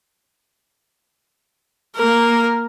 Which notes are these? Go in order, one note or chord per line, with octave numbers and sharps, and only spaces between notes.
A#3 A#4